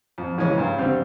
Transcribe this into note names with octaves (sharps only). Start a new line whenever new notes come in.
F2
C#3 E3 G#3 C#4
G2
D3 G3 C4